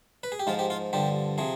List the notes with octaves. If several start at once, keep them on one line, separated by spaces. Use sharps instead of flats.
B4
G#4
G4
G#2 F3 F4
G4
F4
G2 D3 F3 G4
C3 F3 G#4